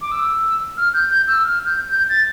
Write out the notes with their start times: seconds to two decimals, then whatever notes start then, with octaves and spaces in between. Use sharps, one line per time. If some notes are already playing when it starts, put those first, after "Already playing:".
0.01 D6
0.12 E6
0.77 F6
0.94 G6
1.10 G6
1.28 E6
1.44 F6
1.65 G6
1.88 G6
2.09 A6